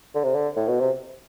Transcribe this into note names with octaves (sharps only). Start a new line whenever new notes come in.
D3
C3
D3
A2
B2
C3